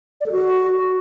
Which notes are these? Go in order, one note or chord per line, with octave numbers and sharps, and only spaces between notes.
D5
A4
F#4